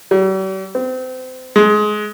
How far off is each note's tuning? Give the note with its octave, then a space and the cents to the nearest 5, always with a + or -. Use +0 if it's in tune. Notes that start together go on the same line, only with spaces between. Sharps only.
G3 -45
C4 -30
G#3 +20